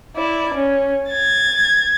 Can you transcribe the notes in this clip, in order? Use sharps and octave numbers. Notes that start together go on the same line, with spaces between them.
E4 D5
C#4
G#6 A6